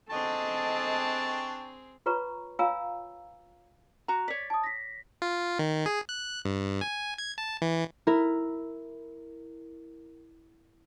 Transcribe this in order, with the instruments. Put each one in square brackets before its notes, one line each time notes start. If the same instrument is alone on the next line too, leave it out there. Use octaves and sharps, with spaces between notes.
[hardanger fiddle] C4 G#4 [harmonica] D4 G5 C#6 [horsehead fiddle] A4 D#5 [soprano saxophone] A5
[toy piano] F4 B4 C#5 A#5 C#6
F4 C#5 F5 G#5 A#5 E6
[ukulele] F#4 A#5
[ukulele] C#5 D5 [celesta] B6
[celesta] A5 D#6
A#6 B6
[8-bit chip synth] F4
D#3
G#4
F#6
G2
G#5
G#6
A5
E3
[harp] E4 A#4